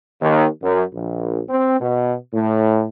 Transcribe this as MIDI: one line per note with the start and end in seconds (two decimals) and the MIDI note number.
0.20 0.46 39
0.62 0.82 42
0.92 1.41 34
1.49 1.80 60
1.80 2.14 47
2.32 2.86 45